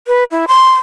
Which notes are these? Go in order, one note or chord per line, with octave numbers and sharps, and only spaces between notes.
B4
E4
C6